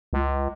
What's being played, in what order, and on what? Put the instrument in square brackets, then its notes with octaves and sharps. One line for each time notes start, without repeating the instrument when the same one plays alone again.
[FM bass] C#2